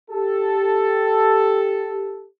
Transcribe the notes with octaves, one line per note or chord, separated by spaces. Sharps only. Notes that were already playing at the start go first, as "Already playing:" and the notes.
G4 A4